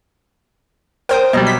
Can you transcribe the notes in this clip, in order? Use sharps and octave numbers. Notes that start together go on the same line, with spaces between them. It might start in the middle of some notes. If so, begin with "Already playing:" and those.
A#4 C5 G5 D#6
B2 F#3 G3 D#5
B6